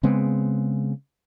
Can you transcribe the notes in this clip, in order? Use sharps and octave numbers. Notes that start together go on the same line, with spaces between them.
C#3 G#3 B3 C4